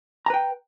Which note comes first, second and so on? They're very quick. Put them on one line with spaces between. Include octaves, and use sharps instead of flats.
A#5 B4 G5